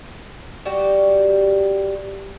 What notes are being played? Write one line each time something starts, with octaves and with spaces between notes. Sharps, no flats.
G3 F#4 G4